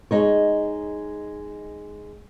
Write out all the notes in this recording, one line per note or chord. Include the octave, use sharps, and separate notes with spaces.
G#3 D#4 C#5